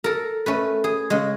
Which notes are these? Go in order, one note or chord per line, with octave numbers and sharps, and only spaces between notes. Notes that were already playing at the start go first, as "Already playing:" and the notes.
A4 A#4
A3 C#4 B4
G#4
C#3 G#3